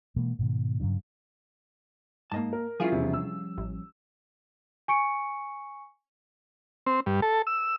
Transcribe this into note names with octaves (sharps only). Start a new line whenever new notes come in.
B2 E3 G#3 A#3
G#2 B2 D#3
G2 C#3 F#3 D4
G#2 A#3 D#5 A5
A#4
F3 G3 C#4 E4 F4 G#4
E1 C3
E6
A1
G#5 C#6 C#7 D7
C4
G2
A4
E6